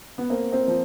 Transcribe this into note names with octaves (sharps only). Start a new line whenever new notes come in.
B3
A#3 C4
A#3 C4
F3